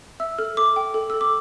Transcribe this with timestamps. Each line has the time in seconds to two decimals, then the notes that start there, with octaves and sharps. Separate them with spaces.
0.20 E5 E6
0.38 A4 F6
0.57 A4 D6
0.76 A4 G5
0.94 A4
1.10 A4 E6
1.21 D6